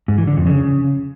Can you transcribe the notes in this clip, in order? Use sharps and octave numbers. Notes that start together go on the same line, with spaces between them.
G#2
E3
D3
F2
C#3